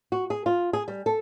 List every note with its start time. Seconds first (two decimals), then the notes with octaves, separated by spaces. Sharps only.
0.12 F#4
0.30 G#4
0.46 F4
0.73 G#4
0.88 G3
1.06 A4